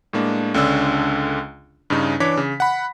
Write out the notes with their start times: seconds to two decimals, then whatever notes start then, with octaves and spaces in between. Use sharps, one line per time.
0.13 A2 G#3 A#3 D4
0.54 C#2 D3 C#4 D4 E6
1.90 G2 C#3 C#4 D#4
2.20 E3 D4 C#5 D6 B6
2.37 C#3
2.60 F#5 B5